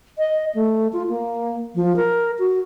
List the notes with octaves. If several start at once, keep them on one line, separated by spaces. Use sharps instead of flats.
D#5
A3
F4
A#3
F3
A#4
F#4